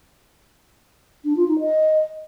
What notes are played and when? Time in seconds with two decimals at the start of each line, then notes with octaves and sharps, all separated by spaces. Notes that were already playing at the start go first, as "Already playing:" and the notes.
1.25 D4
1.36 F4
1.48 D#4
1.59 D#5